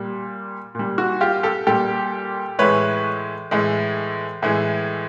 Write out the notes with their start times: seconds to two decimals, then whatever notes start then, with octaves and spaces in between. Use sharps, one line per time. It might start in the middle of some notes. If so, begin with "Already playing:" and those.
Already playing: A#2 G3
0.75 A#2 G3
0.98 F#4
1.21 F4 G4
1.43 G4 A4
1.67 A#2 G3 G4 A4
2.59 A2 E3 G#3 B4 C#5
3.51 A2 E3 G#3
4.43 A2 E3 G#3